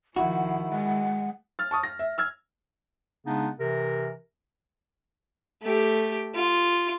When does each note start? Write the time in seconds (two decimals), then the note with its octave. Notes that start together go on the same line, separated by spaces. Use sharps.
0.16 D#3 F3 E4 F#4 F#5
0.71 G#3 F#5
1.59 F6 A6
1.71 A5 C#6 D#6
1.83 A#6
1.99 E5
2.18 E6 F6 G#6
3.25 C#3 G#3 B3 D4 D#4
3.60 C3 E3 A#4
5.62 A3 G4
6.35 F4